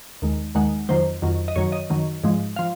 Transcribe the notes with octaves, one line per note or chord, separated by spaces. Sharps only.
D#2 D#3 G#3
D#2 D#3 G#3 F#5
F2 D#3 F#3 C5
F2 D#3 F#3
D#5
F#2 D#3 F#3 C#5
D#5
F#2 D#3 F#3
G#2 F3 G#3
F3 F5